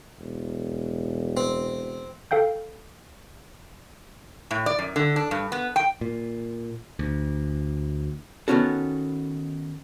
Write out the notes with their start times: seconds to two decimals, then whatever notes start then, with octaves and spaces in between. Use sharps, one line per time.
0.20 E1
1.37 C4
2.31 A4 F5 G5 G6
4.51 A2
4.66 D5
4.79 F#2
4.96 D3
5.16 D4
5.31 G2
5.52 B3
5.76 G5
6.01 A#2
6.99 D2
8.48 D#3 G3 B3 C#4 F#4 A4